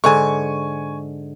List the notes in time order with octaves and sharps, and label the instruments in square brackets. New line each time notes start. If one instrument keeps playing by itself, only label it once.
[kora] G#2 D3 [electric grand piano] G#5 C#6